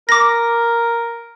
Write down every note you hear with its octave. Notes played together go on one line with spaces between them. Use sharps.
A#4 D6 A#6